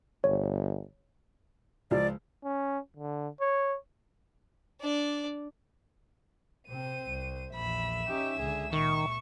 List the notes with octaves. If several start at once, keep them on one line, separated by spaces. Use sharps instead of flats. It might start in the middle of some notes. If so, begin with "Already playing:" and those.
G1 C#5
C#2 F3 D5
C#4
D3
C#5
D4 D5
C3 C4 C5 D#7
C2
A#1 E2 E5 B5 E6
C#4 D#4 G4
C#2 D3 G#4
A#2 D#3 C#6